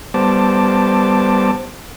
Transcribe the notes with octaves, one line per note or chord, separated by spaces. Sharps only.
G3 B3 C5 A5 D6